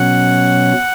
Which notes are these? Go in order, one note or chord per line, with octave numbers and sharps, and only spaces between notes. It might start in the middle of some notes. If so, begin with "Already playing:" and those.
Already playing: B2 F#3 C#4 F#5